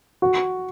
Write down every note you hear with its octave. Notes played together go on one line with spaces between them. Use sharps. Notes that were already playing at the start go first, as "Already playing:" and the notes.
F#4